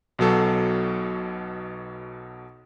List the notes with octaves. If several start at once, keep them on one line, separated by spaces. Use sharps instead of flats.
B1 B2 F#3 A4